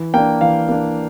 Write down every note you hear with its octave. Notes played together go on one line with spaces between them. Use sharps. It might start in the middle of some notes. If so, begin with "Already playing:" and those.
Already playing: E3
A#3 D4 G5
E3 F5
A#3 D4